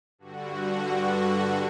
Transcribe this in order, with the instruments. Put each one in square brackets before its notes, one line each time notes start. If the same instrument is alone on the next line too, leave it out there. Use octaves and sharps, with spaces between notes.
[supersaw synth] G2 D3 F#4